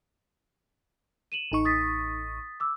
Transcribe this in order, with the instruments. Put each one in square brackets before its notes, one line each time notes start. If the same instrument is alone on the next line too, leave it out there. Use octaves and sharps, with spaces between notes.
[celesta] D#7 E7 F#7
[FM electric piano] A1 D#4 C#6
[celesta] D#6 A6 B6
D6 E6